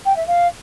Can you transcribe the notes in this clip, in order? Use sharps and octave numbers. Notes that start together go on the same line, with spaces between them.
G5
E5
F5